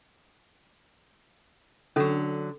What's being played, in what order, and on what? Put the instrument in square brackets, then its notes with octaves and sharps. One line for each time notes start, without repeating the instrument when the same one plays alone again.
[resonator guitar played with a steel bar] D3 F#3 [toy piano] C#4 A4